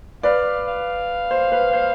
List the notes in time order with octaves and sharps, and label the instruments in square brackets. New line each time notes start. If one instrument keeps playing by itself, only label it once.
[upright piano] B4 D5 [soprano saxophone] F5
[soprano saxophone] F5
[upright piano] C5
B4
C5